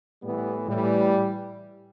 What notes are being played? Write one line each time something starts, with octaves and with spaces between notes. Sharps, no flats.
A2 E3 G3 B3
A2 E3 G3